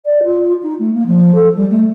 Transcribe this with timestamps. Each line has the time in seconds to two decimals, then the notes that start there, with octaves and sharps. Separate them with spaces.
0.05 D5
0.24 F4
0.62 D#4
0.79 A3
0.93 A#3
1.06 F3
1.34 A4
1.56 G3
1.70 A3